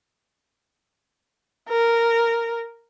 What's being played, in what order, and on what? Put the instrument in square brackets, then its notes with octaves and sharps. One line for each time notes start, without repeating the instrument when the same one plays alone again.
[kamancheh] A#4